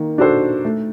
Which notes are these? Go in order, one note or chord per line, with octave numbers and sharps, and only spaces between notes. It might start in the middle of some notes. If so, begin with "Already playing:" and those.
Already playing: D#3 A#3
D4 F#4 A4 C5
A3